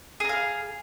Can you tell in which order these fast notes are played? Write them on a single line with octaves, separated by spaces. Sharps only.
G#4 A#5 F5